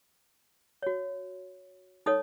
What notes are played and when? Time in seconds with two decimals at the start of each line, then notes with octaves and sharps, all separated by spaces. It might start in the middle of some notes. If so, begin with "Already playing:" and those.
0.82 F#4 C#5
2.06 D#4 A4 C#5 D#6